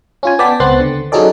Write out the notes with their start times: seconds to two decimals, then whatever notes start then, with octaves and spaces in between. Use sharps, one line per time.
0.23 C#4 F4 G#5
0.39 B3 D5 G5 A5 B6
0.60 C#2 B3 C4 C6 F#6 A6
0.80 D3
1.12 F#3 C#4 D#4 G#4 A4 D5